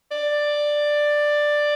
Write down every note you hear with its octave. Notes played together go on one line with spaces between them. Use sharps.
D5